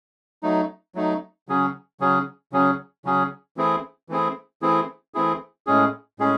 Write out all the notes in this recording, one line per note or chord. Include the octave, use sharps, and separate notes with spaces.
F#3 A3 D#4
F#3 A3 D#4
C#3 F#3 C#4 G#4
C#3 F#3 C#4 G#4
C#3 F#3 C#4 G#4
C#3 F#3 C#4 G#4
E3 A3 C4 E4 G#4
E3 A3 C4 E4 G#4
E3 A3 C4 E4 G#4
E3 A3 C4 E4 G#4
A2 G#3 C#4 G#4
A2 G#3 C#4 G#4